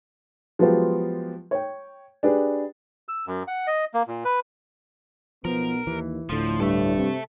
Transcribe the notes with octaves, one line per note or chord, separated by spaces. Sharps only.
F3 F#3 G#3 B3 F4 G4
C#5 G5
D4 G4 G#4 B4
E6
F#2
F#5
D#5
A#3
A#2
B4
B1 B2 F3 B3 A#4
D#2 E3
D1 A2 D3 F3
G2 A4 E5
C3